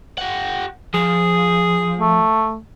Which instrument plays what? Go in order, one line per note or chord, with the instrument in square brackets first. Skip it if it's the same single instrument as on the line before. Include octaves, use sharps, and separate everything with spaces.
[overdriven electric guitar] G4 F#5
[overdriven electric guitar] F3 [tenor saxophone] G#4
[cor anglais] A3